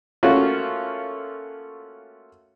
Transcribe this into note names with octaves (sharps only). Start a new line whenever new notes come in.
A3 A#3 C#4 F4 F#4